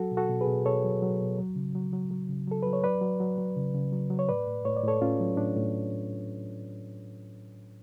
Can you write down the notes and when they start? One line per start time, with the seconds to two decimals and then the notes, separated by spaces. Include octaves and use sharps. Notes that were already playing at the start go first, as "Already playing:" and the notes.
Already playing: F#3 F#4 A4
0.11 B2
0.17 F#4 A4
0.29 B2
0.41 G#4 B4
0.47 B2
0.66 B2 A4 C#5
0.84 F#3
1.02 F#3
1.20 B2
1.38 F#3
1.56 C#3
1.75 F#3
1.93 F#3
2.11 F#3
2.29 C#3
2.47 F#3 A4
2.62 F#3 B4
2.73 C#5
2.83 F#3 B4 D5
3.01 F#3
3.20 F#3
3.38 F#3
3.56 C#3
3.74 C#3
3.93 F#3
4.10 F#3
4.19 C#5
4.29 A2 B4 D5
4.47 A2
4.65 A2 C#5
4.76 D5
4.83 A2 A4 C#5
5.02 A2 C#4 F4
5.20 F#3
5.37 A2 D4
5.56 A2